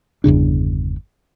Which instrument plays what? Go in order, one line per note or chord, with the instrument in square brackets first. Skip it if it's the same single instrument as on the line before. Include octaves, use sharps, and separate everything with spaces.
[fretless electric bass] G1 E2 C#3 D4